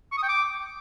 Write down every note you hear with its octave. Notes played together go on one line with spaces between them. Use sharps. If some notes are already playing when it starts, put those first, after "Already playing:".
C#6
D#6
G5
D6